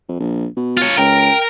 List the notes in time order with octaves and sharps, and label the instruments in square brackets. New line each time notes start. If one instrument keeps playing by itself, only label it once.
[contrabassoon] F2
A#1
B2
[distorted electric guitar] F4 C#5
[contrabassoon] C#2 [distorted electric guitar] A#4 [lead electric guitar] G5